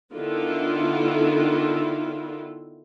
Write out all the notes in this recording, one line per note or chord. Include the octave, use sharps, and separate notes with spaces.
D3 D#3 B3 E4 F4 A4